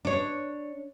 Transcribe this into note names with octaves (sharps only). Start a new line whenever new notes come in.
D4 C#5